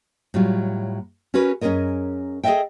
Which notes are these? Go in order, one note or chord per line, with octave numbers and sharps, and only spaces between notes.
A2 F#3 G3 F4
C#4 F#4 G#4 A#4 B4
F#2 C#4 G4 G#4 A#4 D#5
G#4 A4 C5 D#5 E5 G5